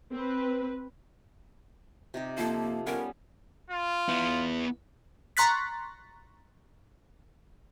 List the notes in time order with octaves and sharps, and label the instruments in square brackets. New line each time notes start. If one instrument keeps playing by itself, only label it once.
[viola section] C4 B4
[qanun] C3 D#4 G4
[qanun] F3 A4 [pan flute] A#3
[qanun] G3 B3 C#4 [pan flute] A#4
[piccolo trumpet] F4
[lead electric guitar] B3 E4
[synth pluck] A#5 C6 C#6 F#6 A6 B6